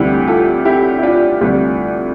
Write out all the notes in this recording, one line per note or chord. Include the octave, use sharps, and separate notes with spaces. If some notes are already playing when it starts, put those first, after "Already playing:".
Already playing: D2 C3 E3 G3 E4 G4
F4 A4
E4 G4
E4
D4 F4
D2 C3 E3 G3